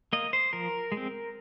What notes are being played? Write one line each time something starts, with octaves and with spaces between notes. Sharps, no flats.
A#3 D#5
C5
F3 A#4
G#3
C4